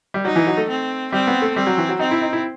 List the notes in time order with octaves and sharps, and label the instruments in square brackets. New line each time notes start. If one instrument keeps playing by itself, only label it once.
[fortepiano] G3
[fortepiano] F#3 [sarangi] D#4
[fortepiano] E3
F#3
A3
[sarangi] C4
[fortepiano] G3 [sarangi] C4
[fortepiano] B3
A3
[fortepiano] G3 [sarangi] C4
[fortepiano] F#3
E3
F#3
[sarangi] C4 [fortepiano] D#4
[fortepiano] E4
D#4
E4